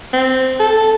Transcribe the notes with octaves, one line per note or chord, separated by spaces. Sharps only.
C4
A4